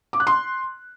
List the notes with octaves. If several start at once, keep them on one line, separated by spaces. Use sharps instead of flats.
D6
F#6
C6